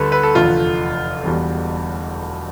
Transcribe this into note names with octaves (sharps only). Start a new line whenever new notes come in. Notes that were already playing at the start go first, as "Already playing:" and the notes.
Already playing: D2 D3 G3 A4 B4
B4
A4
F1 E2 D3 F4
E1 E2 B2 G3